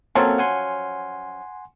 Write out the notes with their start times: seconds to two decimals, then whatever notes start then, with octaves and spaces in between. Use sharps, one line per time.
0.15 F3 F#3 A#3 C4 C#4 A4
0.39 F#5 G#5 C6